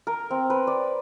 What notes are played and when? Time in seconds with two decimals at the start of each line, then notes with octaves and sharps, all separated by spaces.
0.07 A#4
0.31 C4
0.50 B4
0.67 D5